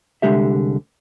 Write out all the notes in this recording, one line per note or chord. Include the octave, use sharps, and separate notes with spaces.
C2 G2 D3 G#3 G4 E5